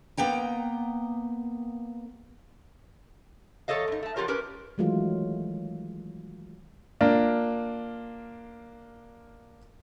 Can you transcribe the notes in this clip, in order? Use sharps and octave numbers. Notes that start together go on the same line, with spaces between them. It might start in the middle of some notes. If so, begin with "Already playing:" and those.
A#3 B3 G5 A#5
E2 A4 C#5 D#5 F5
F#2 D#4
A3 A5
F3 B3 F4 G4 A#4 C#5
C#4 G4 A#4 B4
D#3 E3 F#3 G#3 A3 F4
A#3 D4 F4